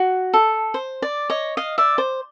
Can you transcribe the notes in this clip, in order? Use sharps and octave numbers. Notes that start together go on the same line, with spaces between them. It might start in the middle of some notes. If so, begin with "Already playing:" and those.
Already playing: F#4
A4
C5
D5
C#5 D#5
D#5 F5
D5 E5
C5